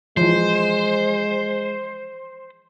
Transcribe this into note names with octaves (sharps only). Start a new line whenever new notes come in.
E3 F3 G#3 C5